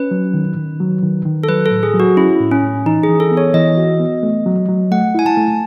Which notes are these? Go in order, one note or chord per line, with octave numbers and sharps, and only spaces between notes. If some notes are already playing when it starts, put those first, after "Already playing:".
Already playing: C#4 B4
F#3
D#3
D#3
F#3
D#3
D#3
A4
F#3 B4
A4
A2
G#4
F#3
F#4
C#4 E4
A2
C#4
A2
E3 D#4
G#4
E3
A4
B3
C#5
E3 D#5
F#4
B3
A3
F#3
F#3
A3 F#5
E4 G#5
A5
A3